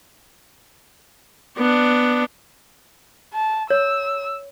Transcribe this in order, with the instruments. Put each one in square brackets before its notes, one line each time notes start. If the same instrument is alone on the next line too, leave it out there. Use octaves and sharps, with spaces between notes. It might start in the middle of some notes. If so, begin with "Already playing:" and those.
[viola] B3 D4
[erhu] A5
[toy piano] C#5 [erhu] E6